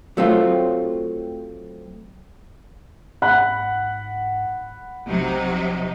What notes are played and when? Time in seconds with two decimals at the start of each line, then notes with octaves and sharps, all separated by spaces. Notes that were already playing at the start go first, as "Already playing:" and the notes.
0.17 F#3 A3 C4 F4
3.22 G#2 F#5 B5 F#6
5.07 B1 C3 F#3 D#4